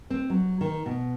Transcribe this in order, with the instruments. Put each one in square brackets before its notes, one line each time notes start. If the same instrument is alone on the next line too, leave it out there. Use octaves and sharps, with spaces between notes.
[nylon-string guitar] C4
F#3
D#3
B2